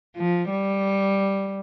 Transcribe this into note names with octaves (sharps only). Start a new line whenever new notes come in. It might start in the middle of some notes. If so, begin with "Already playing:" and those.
F3
G3